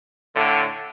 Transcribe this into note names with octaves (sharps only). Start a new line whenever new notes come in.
A2 D3